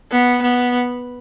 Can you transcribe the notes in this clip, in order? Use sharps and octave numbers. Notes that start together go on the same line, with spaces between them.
B3
B3